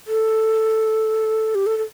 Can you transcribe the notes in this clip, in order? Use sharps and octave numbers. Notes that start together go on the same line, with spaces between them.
A4
G4
A4
A4